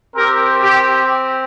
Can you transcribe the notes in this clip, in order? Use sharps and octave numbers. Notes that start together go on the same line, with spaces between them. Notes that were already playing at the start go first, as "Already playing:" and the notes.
C4 G4 A#4
G4